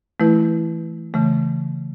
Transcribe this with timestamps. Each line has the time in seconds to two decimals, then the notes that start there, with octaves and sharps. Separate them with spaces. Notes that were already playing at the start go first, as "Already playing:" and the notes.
0.20 E3 A3 E4 B4
1.14 C#3 E3 A3